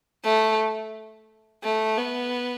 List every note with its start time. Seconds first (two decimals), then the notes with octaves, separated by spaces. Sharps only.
0.24 A3
1.63 A3
1.97 B3